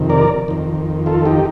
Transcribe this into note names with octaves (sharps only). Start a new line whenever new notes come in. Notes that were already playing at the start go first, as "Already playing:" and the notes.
Already playing: F2 C3 D#3
A#4 D5
F2 D#3
F4 A4
D#4 G4